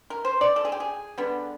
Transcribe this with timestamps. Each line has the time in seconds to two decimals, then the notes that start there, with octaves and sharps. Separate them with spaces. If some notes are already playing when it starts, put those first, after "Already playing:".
0.10 A#4
0.25 C5
0.41 D5
0.56 A4
0.65 G#4
0.72 G4
0.80 G#4
1.18 D3 G3 B3